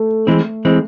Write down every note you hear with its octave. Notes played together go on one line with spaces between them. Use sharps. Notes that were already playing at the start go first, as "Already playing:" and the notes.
Already playing: A3
E3 G#3 A3 C4
E3 G#3 C4